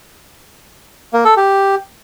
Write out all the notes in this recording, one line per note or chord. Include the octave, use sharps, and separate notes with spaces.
A#3
A4
G4